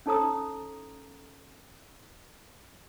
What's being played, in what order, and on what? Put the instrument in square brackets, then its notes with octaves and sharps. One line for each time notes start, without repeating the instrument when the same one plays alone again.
[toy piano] C#4 D#4 A4 C#5 A#5 D#6